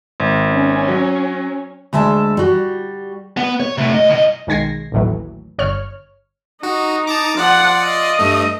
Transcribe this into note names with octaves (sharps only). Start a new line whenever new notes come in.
G#1
C#4
F#3
D2 G#3 E5 A5
G3 F#4
B3
C#5
C3 A3
G2 D#5
C2 D#5
B1 D#3 G#3 G#6 A#6 C7
A1 D#2 A2 E3 F#3
G1 C#5 F6
D#4 F#4
A5 A#5 D6
F3 F4 D5 F#5
D#5
G2 A3